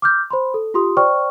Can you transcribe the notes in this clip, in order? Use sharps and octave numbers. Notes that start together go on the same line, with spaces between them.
D6 F6 G6
C5 B5 C6
A4
F4 G4 C6 D#6
C5 D5 G5 C#6 F6